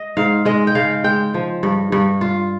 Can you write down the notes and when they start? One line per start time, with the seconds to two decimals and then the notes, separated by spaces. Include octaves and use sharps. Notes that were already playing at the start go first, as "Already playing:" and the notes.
Already playing: D#5
0.17 G#2 F5
0.45 G#3 D#5
0.67 G5
0.75 C#3 F5
1.04 G#3 G5
1.34 F3
1.63 G2
1.92 G2
2.21 F4